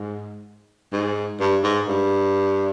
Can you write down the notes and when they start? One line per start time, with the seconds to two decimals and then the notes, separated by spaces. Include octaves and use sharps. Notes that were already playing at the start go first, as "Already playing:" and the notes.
Already playing: G#2
0.92 G#2
1.40 G2
1.64 G#2
1.88 G2